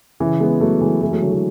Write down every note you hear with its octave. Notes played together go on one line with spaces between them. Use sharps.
C#3 E3
G#3 B3
F#3 A3
E3 G#3
E3 G#3
F#3 A3
D3 F#3
E3 G#3